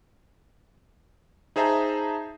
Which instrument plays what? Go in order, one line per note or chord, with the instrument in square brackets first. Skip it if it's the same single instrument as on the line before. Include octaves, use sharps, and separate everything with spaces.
[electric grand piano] D#4 G#4 C5 E5 A5 A#5